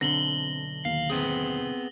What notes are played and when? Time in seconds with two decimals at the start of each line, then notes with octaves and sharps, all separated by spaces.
0.01 B1 D3 C4 A#6 F#7 G7
0.85 D#2 F5
1.10 B3 C4 G#4